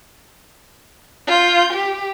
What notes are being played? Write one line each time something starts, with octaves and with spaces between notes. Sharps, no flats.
F4 G6
G4